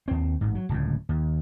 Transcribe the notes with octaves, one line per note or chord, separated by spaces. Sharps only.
D#2 C4
A1 G#2
F#3
D1 C#2 A2
D#2